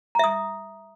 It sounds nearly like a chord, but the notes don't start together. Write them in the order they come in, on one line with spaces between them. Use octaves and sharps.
A#5 E5 D#6